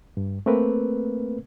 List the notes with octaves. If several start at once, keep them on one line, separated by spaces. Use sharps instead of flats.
G2
A3 A#3 C4 A#4 B4